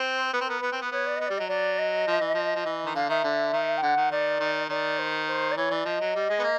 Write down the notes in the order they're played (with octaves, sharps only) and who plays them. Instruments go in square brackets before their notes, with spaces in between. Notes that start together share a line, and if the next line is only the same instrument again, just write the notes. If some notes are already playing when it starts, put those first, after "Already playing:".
Already playing: [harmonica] C4 [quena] C5
[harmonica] B3 [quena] B4
[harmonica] C4
[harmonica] B3 [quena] A#4
[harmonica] B3 [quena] B4
[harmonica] C4
B3
[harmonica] B3 [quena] C#5
[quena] D5
[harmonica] B3 [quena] D#5
[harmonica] G3 [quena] D5
[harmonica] F#3 [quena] D#5
[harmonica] F#3 [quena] D5
[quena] D#5
[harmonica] F3
E3
F3
F3
E3
D#3
[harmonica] D3 [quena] F5
[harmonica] D#3 [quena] E5
[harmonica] D3
D#3
[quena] G5
[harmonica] D3 [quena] F#5
[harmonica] D#3
[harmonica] D#3 [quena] D5
[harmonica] D#3
[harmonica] D#3 [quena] D5
[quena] C5
C5
D5
[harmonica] E3 [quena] C#5
[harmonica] E3 [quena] D5
[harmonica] F3 [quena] D#5
[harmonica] F#3
G3
G#3
B3
A#3